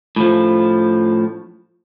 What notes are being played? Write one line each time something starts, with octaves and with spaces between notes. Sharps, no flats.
A2 F3